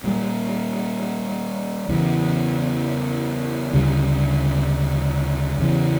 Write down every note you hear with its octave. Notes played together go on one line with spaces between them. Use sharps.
A#2 G3 A#3
E2 C#3 E3
D2 C#3 G3
E2 C#3 E3